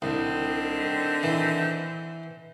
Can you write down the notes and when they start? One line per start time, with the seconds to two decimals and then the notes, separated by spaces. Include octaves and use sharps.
0.02 C2 D3 D#3 C4
1.23 E3